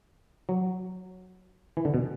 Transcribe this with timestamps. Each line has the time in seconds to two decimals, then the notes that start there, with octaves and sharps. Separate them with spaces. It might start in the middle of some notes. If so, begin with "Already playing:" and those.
0.49 F#3
1.77 E3
1.85 D3
1.94 B2